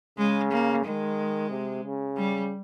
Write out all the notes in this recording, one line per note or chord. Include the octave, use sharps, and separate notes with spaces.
C#3 G#3
A#3
D#3 G#3
C3
C#3
G3